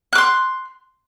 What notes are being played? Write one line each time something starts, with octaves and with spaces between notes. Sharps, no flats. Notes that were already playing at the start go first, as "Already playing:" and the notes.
C6 D6 F#6